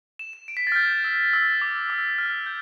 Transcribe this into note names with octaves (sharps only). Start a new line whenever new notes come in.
E7
E7
D7
B6
A6
F6
G6
E6
E6
D6
E6
F6
G6